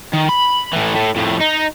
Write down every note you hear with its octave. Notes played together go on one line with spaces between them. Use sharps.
D#3
B5
A2 E3
A2
F2 A2
D#4